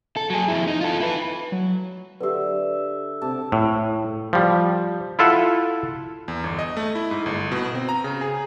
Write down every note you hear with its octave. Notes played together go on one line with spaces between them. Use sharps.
A4
F#3 G#4
F2 E4
D#4
F4 A4
E4 B4
F#3
D3 G4 B4 E5
C3 A5
A2
F3 G3
E4 F4 A4 E5 F#5
E2
G1
D#5
A3
E4
G#2
G1
B2
C4
A#5
C#3
G#4